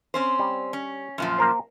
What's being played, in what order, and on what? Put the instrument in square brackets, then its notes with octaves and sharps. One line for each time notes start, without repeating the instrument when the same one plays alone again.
[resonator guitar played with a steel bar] C4 C#4 C5
[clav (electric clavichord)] G3
[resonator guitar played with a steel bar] C#4
F#2 A#2 F3
[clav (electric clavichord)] A#3 A#4 C5